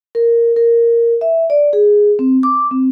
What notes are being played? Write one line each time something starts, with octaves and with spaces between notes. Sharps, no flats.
A#4
A#4
E5
D5
G#4
C4
D6
C4